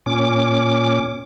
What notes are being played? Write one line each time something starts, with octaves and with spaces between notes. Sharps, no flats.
A#2 C#4 D6